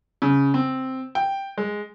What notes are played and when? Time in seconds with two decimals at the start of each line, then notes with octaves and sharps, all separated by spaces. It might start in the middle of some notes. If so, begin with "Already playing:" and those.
0.22 C#3
0.54 C4
1.15 G5
1.58 G#3